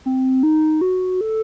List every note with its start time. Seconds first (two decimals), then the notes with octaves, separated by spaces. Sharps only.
0.06 C4
0.43 D#4
0.81 F#4
1.21 A4